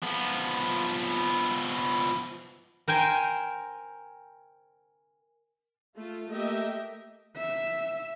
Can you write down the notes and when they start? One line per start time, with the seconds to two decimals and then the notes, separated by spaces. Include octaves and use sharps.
0.03 F3 B3
2.88 A#4 C5 G5 G#5
5.95 A3 F4
6.30 A3 A#3 G4 D#5 E5
7.36 E5